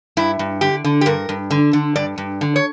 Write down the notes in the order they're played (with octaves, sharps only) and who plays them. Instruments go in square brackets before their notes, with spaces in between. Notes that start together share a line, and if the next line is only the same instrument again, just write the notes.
[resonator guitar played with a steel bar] G2 E4
G2
D3 G4
D3
G4
G2 A#4
G2
D3
D3
G2 D5
G2
D3
C#5